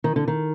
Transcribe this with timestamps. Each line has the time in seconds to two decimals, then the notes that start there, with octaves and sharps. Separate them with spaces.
0.04 D#3
0.16 D3
0.28 D#3